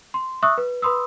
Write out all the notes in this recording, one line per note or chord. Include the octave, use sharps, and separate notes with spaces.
C6
E5 C#6 D#6 E6 F#6
B4
B4 B5 C6 D#6 E6